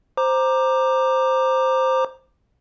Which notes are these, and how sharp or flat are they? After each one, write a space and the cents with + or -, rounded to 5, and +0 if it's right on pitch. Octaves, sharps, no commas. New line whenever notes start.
C5 +0 A#5 +5 D6 +15